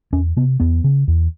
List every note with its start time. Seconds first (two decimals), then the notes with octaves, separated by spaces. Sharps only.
0.12 E2 C#4
0.37 C3 B3
0.60 E2 B3
0.84 C#3
1.08 E2